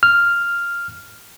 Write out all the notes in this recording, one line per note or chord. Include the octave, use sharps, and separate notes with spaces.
F6